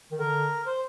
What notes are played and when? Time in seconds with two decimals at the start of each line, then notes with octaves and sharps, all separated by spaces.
0.11 D#3
0.20 D3 A#4
0.66 C5